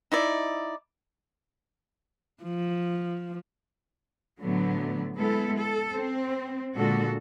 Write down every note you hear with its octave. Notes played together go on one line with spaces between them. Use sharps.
D#4 E4 D5
F3
A2 D3 F#3 A3 B3
G#3 B3 E4 A4
A4
C4
A#2 D3 G#3 F#4 A4